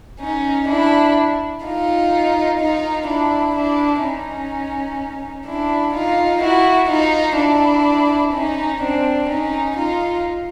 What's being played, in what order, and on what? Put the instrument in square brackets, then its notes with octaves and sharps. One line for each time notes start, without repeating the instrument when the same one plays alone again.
[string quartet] C#4 D#4
D4 E4
D#4 F4
D#4 F4
D4 E4
D4 E4
C#4 D#4
D4 E4
D#4 F4
E4 F#4
D#4 F4
D4 E4
C#4 D#4
C4 D4
C#4 D#4
D#4 F4